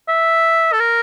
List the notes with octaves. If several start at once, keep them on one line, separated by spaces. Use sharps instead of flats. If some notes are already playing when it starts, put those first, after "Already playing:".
E5
A4
A#4